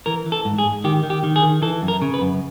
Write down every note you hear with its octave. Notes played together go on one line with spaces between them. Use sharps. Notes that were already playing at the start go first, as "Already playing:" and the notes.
E3 A#4
E3
A4
G#2
G#4
G#2
D#3 G4
D#3
G4
D#3
G#4
D#3
E3 A4
F#2
A#4
C#3
B4
F#2